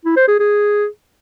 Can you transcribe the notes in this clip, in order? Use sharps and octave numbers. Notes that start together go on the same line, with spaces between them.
E4
C5
G#4
G#4